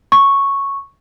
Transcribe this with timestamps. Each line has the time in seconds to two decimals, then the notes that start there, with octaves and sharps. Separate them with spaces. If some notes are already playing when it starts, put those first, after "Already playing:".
0.12 C#6